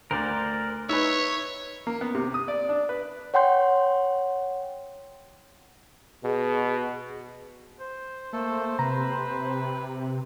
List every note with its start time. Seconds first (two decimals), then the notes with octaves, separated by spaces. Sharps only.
0.11 D2 A#4 C5 D5
0.89 D#4 B4 C#5 E5
1.87 A#3
2.01 B3
2.15 C3
2.34 D#6
2.48 D5
2.69 D4
2.89 B4
3.34 C#5 F#5 G5 C6 G6
6.24 B2 G#4
7.80 C5
8.33 A3 A#3 A4
8.79 C3 B4 A#5